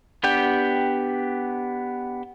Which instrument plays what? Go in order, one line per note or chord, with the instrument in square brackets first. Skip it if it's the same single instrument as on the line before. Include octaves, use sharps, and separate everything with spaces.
[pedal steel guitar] B3 D4 G4 G5